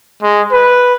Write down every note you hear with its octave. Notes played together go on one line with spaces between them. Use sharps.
G#3
B4